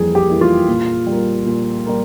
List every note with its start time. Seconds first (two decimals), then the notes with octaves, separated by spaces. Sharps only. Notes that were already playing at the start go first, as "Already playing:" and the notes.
Already playing: F2 E3 G3 A#3 G#4
0.15 G4
0.28 E3 G3 A#3
0.41 F4
0.68 A#2
1.07 G3 A#3
1.46 A#2
1.86 G3 A#3